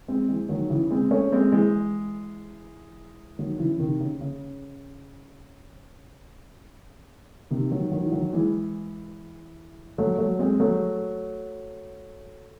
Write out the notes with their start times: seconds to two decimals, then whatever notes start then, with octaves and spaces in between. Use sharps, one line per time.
0.08 G#3 C4
0.28 E3 G#3
0.49 D#3 F#3
0.70 C#3 E3
0.90 G#3 C4
1.11 A3 C#4
1.32 G#3 C4
1.52 E3 G#3
3.39 D#3 F#3
3.58 C#3 E3
3.72 E3
3.79 C3 D#3
4.00 C#3
4.21 C#3
7.50 C3 D#3
7.71 D#3 F#3
7.91 D#3 F#3
8.03 E3
8.12 D#3 F#3
8.33 E3 G#3
9.98 F#3 A3
10.18 F#3 A3
10.39 G#3 C4
10.60 F#3 A3